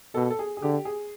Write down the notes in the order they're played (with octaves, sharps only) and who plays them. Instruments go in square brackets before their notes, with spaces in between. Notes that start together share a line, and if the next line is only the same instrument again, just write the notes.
[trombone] B2 [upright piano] A4
[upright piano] A4
G#4
G#4
[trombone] D3 [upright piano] G4
[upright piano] G#4